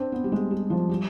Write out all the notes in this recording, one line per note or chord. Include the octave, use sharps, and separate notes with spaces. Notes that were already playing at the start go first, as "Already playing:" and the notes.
Already playing: C4 D4
B3
G3
G#3
G3
F3
G3